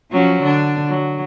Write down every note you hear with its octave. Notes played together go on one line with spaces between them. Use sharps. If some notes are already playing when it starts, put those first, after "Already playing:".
F3 F#3 C#4
D3 D4
F#3